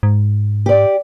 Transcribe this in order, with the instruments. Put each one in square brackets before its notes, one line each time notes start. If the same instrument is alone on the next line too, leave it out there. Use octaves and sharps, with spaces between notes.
[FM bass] G#2
[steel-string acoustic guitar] G4 D5